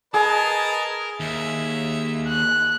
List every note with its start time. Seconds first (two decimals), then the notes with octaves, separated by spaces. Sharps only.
0.14 G#4 A#4 B4 D#5 A5
1.20 D#2 E5
2.29 F#6